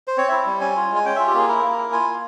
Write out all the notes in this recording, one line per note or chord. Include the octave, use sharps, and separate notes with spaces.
C5
C4 C#5
E4 E5
G3
C#4 G#5
F4
G#3 G#5
C#4 G5
F4 E5
G4
A#3 G#4
E4 A#4
A#3
E4
F4 G#5
A#3